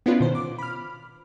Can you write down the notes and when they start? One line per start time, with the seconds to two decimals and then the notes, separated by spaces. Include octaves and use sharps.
0.06 B3 C#4 D4 E4 F4 B4
0.20 B2 D#3 C5
0.35 D6
0.58 B5 F6